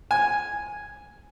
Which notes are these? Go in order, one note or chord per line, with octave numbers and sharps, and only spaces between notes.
G#5